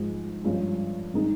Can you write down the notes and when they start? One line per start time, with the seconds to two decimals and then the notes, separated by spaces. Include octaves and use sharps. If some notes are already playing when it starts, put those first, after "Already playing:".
Already playing: G#2 F3 G#3
0.44 G2 F3 G#3 C#4
1.14 D#3 G#3 D#4